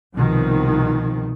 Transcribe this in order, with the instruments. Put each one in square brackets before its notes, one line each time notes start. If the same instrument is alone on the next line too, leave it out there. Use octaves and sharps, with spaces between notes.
[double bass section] C2 B2 D#3 F3